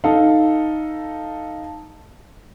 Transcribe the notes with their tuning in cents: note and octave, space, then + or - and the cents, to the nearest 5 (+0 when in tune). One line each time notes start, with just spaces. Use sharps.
D#4 +0 A4 +0 F5 +0